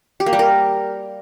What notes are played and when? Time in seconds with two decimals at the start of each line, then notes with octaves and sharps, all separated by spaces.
0.20 G4
0.26 A#3
0.33 G3
0.39 A#4